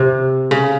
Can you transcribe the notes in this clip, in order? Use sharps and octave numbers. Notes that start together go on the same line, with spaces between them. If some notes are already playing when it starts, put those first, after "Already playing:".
Already playing: C3
C#3